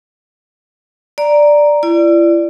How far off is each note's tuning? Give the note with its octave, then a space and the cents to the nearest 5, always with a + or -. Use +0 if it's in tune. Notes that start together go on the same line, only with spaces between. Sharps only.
D5 +0 A#5 +0
E4 +40 D5 +0